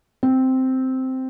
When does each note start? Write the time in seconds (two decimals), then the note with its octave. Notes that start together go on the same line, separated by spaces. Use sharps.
0.23 C4